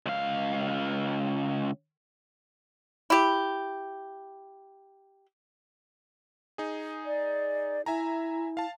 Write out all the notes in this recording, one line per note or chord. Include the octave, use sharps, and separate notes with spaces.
C#2 F5
E4 G4
D#4 G#4
D5
E4 E5 G#5 A#5
F5 A5